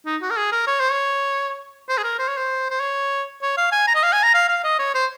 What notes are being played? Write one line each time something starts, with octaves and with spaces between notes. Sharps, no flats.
D#4
F#4
A#4
G#4
A#4
C#5
C5
C#5
C5
G#4
A#4
C5
C#5
C5
C5
C#5
C#5
F5
G#5
A#5
D#5
F5
G#5
A#5
F5
F5
D#5
C#5
C5